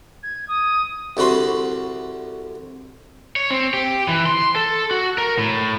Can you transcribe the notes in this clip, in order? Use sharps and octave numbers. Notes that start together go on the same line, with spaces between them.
G#6
D#6
C2 D3 F#4 B5 C6
C#5
C4
G4
E3
C6
A4
F#4
A#4
A2